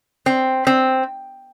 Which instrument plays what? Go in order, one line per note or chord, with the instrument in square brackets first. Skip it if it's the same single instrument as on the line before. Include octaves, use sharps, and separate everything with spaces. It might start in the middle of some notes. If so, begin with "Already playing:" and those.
[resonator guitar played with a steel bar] C4
C4